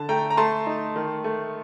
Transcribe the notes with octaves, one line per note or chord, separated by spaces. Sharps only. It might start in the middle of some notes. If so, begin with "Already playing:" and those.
Already playing: D3 A5
A3 G5 A#5
A#5
A3 A5 C6
D#4
D#3
A3